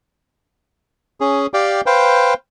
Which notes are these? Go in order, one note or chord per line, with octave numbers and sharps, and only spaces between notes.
C#4 G#4
G4 D5 F5 G5
B4 C5 F5 G5